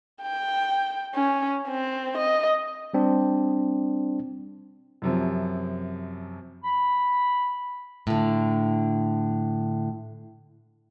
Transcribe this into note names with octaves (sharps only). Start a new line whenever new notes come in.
G5
C#4
C4
D#5
G3 C4 D4
F#2 C3 F3
B5
A2 D3